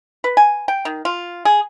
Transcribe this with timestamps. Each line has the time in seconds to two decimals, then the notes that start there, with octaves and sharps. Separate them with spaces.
0.24 B4
0.37 G#5
0.68 G5
0.85 D#3
1.05 F4
1.45 G#4